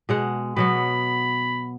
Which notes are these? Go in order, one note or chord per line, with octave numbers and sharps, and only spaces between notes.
B2 G#3 F#5
B2 F#3 B3 B5